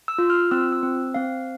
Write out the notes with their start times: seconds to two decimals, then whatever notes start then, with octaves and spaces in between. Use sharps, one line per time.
0.08 E6
0.18 F4
0.30 F6
0.51 C4 E6
0.72 E6
0.83 C4
1.14 C4 F5